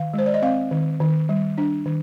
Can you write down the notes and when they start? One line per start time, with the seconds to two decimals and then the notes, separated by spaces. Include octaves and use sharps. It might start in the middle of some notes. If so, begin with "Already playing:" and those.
Already playing: D#3 F5
0.14 G#3 C5
0.26 D5
0.34 D#5
0.42 C4 F5
0.71 D#3
1.00 D#3
1.29 G3
1.58 D4
1.86 D#3